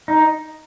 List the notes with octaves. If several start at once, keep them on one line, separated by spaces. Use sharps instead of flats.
D#4